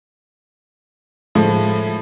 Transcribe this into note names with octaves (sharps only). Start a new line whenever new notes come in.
A2 F3 G#3